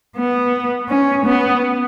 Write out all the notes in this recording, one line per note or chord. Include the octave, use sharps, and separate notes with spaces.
B3
C#4
B3